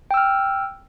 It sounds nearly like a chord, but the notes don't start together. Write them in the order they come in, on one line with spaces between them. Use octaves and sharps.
G5 E6 F6